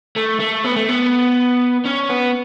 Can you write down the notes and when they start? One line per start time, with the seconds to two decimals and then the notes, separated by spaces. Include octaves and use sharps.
0.16 A3
0.40 A3
0.65 B3
0.76 A3
0.89 B3
1.86 C#4
2.10 B3